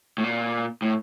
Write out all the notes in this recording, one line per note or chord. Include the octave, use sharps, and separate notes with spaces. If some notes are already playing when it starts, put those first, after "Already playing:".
A2
A#2
A2